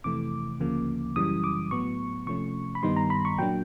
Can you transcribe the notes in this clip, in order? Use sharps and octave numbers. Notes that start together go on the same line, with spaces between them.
F2 C3 E3 A3 D6
D2 C#3 F3 A#3
F#2 C#3 E3 G3 D#6
D6
A2 F#3 B3 C#6
C3 F3 A3 C#4 C#6
B5
G2 D#3 G3 B3 D#4 C6
A#5
B5
C#6
A#2 F#3 A#3 D4 G5